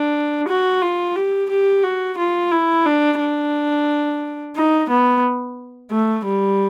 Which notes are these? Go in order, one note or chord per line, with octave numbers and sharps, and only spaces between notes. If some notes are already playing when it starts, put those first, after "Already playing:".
Already playing: D4
F#4
F4
G4
G4
F#4
F4
E4
D4
D4
D#4
B3
A3
G3